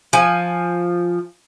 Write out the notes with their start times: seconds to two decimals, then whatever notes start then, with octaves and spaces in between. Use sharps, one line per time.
0.13 F3 G#5